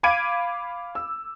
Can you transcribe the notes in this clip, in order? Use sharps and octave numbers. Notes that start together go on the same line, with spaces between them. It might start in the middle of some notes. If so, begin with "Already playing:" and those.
F5 B5 D6 G#6 D7 D#7
E6